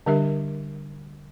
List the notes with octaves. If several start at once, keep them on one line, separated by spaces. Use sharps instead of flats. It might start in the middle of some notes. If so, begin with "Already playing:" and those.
D3 G3 D4 G4 A#4 E5